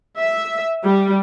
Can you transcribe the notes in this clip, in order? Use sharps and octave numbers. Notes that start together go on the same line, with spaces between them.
E5
G3